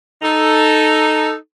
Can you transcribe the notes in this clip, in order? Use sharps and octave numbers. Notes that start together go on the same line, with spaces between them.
D#4 A4